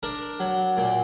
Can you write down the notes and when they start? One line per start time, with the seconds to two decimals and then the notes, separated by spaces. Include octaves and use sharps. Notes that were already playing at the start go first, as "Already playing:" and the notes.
0.03 D4 A#4
0.40 F#3
0.77 A#2